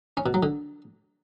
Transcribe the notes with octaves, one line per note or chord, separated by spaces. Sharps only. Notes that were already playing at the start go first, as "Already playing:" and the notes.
C#4
B2
F#3
D3